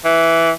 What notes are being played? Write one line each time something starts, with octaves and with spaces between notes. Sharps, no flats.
E3